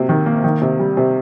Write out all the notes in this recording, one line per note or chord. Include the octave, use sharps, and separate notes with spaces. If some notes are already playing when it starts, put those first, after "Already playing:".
Already playing: C3 F#3 A#3
D#3
A#3
D#3
C3
G3
C3